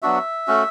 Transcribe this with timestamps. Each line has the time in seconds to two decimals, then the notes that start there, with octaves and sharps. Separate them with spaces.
0.02 F#3 B3 D4 F#4 E5
0.48 A3 C#4 F#4